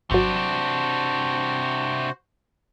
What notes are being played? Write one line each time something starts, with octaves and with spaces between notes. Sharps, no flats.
G#1 C3 F#3 D4 F#4 C5